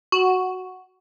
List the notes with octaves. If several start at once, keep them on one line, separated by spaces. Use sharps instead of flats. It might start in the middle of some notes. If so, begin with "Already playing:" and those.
F#4